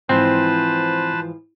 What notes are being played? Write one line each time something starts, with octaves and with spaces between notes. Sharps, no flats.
G#2 E3 F3 C4 B4 C5 A5